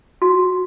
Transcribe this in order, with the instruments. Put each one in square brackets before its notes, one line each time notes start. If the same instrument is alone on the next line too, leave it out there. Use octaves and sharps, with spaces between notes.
[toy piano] F#4